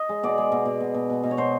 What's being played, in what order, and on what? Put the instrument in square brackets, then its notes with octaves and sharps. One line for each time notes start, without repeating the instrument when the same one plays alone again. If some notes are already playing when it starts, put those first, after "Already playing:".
Already playing: [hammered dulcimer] D#5
G#3
B2 D5
G#3
B2
B2
B2
B2
B2
B2
C#5
B2 C5